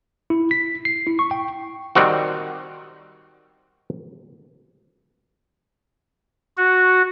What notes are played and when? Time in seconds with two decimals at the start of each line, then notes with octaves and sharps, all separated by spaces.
0.30 E4
0.51 B6
0.85 C7
1.07 E4
1.19 C#6
1.31 G5
1.95 D#3 G3 C4 F#4
6.57 F#4